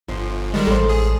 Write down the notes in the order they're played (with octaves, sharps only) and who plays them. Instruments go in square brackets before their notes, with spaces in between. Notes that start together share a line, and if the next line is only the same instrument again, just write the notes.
[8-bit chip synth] G1 [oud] F3
[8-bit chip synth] D#3 G3 G#3
[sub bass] A1 [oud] A4 C5
[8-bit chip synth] G#4